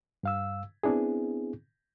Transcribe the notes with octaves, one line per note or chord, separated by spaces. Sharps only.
G2 F5 E6
B3 C4 D4 E4 G#4